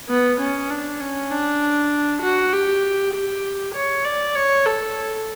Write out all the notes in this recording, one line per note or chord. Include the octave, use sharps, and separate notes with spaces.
B3
C#4
D4
C#4
D4
F#4
G4
G4
C#5
D5
C#5
A4